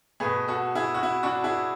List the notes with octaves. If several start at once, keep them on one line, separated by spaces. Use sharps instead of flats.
B2 A3 G#4 B4
F#4 A4
E4 G#4
F#4
E4
D4 F#4
E4 G#4